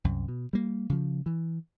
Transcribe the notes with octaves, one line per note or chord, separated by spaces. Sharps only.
C2 F#2
B2
G3 A#3
C#3 F3
E3